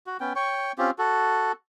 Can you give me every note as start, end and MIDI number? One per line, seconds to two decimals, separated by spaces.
0.07 0.17 66
0.20 0.33 59
0.20 0.33 61
0.20 0.33 79
0.36 0.72 73
0.36 0.72 79
0.36 0.72 85
0.78 0.91 60
0.78 0.91 61
0.78 0.91 65
0.78 0.91 67
0.98 1.52 66
0.98 1.52 69